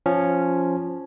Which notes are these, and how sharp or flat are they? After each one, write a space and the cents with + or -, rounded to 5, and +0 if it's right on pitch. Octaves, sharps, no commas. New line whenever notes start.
F3 +0 C#4 +0